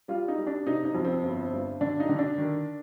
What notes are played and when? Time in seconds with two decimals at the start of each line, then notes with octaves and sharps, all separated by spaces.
0.08 G3 F4
0.28 D#4
0.38 G3
0.47 D4
0.66 C3 D#4
0.85 D#4
0.95 F2
1.05 C4
1.23 G1
1.52 G2
1.81 D3 D4
2.00 D#4
2.09 D3
2.19 D4
2.38 D#3